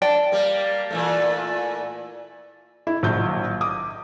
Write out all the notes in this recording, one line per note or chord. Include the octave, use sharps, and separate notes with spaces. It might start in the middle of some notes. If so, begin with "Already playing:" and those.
D5 G5 A5
G3 A#3
A#2 E3 A3
E4
A#1 F#3 G6
D6 D#6